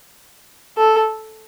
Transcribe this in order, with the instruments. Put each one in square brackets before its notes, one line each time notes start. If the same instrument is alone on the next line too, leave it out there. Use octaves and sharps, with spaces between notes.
[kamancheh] A4